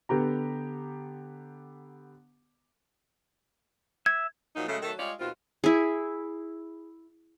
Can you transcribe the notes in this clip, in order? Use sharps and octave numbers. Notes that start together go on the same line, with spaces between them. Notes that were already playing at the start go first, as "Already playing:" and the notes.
D3 B3 G4 A#5
E5 G#6
A#2 F3 F#3 D#4
C#3 F#3 G#3 A3
D#3 F#3 A3 A4
G3 G#3 F4 C#5 D5
D#2 B2 C4 F4
E4 G#4